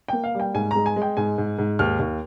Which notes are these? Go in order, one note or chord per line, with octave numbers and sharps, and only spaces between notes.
A#3 G5
F5
G3
G5
G#2 G#5
G#3 A#5
G#5
G#3
G5
G#2 G#5
G#2
G#2
D#2 F6
D#2